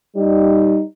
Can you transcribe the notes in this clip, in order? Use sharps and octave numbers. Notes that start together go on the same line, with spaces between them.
G3 D#4